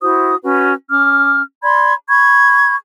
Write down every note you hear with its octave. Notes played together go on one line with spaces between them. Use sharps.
E4 F#4 C5 D#6
C#4 F#4 B4
C#4 D6 F6
D5 B5 C6 G#6
B5 C#6 G#6